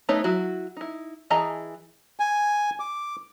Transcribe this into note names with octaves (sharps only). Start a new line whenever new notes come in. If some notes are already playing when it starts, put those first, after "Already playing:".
A3 B3 D#4 C#5
F#3 E4 F#4
D#4 E4
E3 G#4 D#5 A5 A#5
G#5
D6